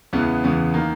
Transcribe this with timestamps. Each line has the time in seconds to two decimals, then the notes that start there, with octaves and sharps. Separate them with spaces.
0.13 E2 C#3 E3 B3
0.44 E2 C#3 E3 B3
0.74 D#3 A#3